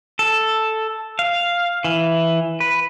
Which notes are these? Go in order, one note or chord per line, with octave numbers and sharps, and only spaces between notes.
A4
F5
E3
B4